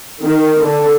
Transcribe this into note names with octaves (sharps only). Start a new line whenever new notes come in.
D#3
D3